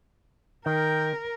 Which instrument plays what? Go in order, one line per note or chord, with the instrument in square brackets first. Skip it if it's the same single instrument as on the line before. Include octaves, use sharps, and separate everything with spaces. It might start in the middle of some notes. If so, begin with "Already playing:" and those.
[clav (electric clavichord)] D#3 [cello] A#4 [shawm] G5